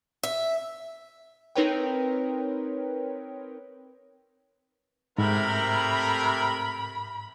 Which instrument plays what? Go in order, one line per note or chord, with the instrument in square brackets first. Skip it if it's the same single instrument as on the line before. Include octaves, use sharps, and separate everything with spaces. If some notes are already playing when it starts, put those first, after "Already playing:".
[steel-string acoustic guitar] E5
[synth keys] C4 D#4 A#4 B4 C#5 G5
[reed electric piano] G#2 [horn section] C3 A3 A#4 [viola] B5